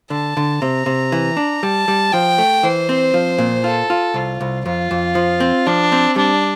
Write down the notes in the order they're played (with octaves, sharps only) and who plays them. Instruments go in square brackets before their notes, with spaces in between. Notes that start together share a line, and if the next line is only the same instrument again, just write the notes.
[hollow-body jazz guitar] D3 [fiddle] A5
[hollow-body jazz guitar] D3
[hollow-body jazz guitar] C3 [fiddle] A#5
[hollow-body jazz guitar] C3
E3
D4
[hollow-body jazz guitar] G3 [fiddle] A5
[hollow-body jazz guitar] G3
[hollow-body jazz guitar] F3 [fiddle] G5
[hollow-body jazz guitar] A3
[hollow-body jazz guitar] E3 [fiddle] C5
[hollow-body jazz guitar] C4
F3
A#2
[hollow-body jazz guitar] F4 [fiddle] A4
[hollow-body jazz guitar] F4
[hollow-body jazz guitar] C2 [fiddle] F4
[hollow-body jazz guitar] C2
[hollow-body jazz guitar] F2 [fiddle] F4
[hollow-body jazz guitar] F2
F3
C4
[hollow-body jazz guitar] F3 [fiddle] D4
[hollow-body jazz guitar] C4
[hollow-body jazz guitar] G3 [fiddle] D4